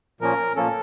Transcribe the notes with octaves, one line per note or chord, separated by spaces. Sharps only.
A#2 F3 A#3 C#4 A#4
A#2 F3 A#3 C#4 A4